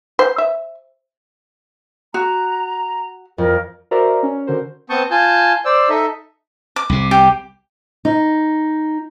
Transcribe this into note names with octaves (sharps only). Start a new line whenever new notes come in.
C5
E5
F#4 A#5
F2 A#4
F#4 A#4 C5 D5 E5 A#5
C#4
D3 F#4 A#4 C5
B3 C4 A5 C#6 D#6 G6
F4 G#5 A5 G6
C5 D5 E6
D#4 A4 D#5 E5
D6
C2 C3
G4
D#4